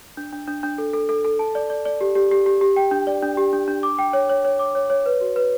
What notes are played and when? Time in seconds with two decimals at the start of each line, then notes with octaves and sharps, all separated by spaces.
0.17 D4
0.32 D4
0.48 D4
0.63 D4
0.78 A4
0.93 A4
1.09 A4
1.24 A4
1.39 A5
1.55 D5
1.70 D5
1.85 D5
2.01 G4
2.15 G4
2.31 G4
2.46 G4
2.61 G4
2.76 G5
2.91 D4
3.07 D5
3.22 D4
3.37 G4
3.53 D4
3.68 D4
3.83 D6
3.99 G5
4.13 C#5
4.29 C#5
4.45 C#5
4.59 D6
4.75 C#5
4.90 C#5
5.06 B4
5.21 F#4
5.36 B4